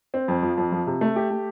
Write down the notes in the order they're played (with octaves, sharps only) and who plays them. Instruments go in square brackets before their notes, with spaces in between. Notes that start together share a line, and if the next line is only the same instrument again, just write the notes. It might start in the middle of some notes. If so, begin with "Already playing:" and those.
[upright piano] C4
F2
F3
F2
F3
C3
A3
G4
A3